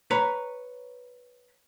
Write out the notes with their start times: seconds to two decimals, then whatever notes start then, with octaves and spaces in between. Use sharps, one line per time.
0.11 B4 C#5 A#5 B5